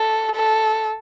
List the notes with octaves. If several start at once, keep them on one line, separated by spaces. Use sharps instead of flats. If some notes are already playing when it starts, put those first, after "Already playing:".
Already playing: A4
A4